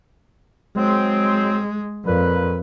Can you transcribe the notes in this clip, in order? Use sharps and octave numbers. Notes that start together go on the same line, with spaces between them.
F#3 G#3 C4
F2 A#2 B4